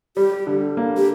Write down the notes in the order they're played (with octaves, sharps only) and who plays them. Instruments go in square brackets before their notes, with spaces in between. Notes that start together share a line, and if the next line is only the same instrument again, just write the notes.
[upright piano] G3 [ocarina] G4
[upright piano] D3
A#3
[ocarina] G4